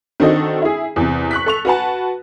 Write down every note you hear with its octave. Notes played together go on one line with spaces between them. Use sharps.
D#3 C4 D4 F#4 A4 D#5
E4 G#4
E2 C3
C#6 F#6 B6
A4 C#6 F7
F#4 B4 F#5 A5